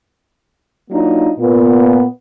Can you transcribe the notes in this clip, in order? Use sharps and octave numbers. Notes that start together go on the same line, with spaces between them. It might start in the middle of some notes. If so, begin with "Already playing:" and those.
F#3 A#3 D4 D#4 F4
A#2 B3